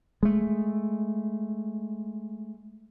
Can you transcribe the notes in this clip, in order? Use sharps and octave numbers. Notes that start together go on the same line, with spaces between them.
G#3 A3